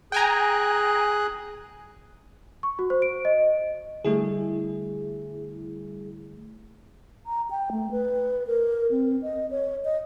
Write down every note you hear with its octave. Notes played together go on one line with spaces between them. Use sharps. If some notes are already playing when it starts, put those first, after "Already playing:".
G#4 G5 G#5 A#5 F#6
C#6
F#4
C5
D7
D#5
D3 G3 A3 E4 G#4
A#5
G5
A3
B4
A#4
C4
D#5
C#5
D#5